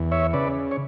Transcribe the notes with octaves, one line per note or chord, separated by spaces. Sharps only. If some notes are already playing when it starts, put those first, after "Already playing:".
Already playing: E2
C#5 E5
C#3 B4 D5
C#5